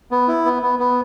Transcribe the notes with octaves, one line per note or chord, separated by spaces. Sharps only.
B3
E4
B3
B3
B3